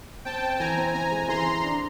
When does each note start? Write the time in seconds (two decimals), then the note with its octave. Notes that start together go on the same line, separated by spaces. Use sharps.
0.25 C4 G5 A5
0.43 C4
0.59 E3 G#5 A#5
0.78 C4
0.94 C4 G#5 A#5
1.12 G#3
1.28 E3 A#5 C6
1.46 C4
1.64 D4